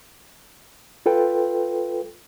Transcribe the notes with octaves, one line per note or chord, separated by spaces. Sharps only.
F4 A4 B4 G5